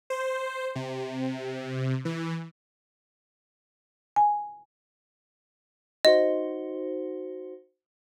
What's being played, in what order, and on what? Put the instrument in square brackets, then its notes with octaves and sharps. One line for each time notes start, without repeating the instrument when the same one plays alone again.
[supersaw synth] C5
C3
E3
[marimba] G#5
[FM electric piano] D#4 F#4 C5 [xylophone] D#5